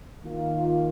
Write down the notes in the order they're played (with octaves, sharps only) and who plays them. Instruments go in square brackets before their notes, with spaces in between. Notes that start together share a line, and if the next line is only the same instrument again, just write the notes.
[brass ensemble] D#3 A#3 F4